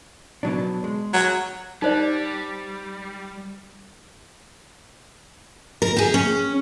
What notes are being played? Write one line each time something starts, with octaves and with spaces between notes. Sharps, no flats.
B2 F#3 D4
G#3
F#3
G3 D#4 C5 D5
A#4
G4 G#4
C#4